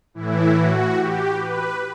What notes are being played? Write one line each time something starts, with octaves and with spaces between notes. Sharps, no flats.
A2 E3 E4
F#4
G4
B4